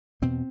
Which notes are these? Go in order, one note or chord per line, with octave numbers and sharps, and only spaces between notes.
E2 B2 C4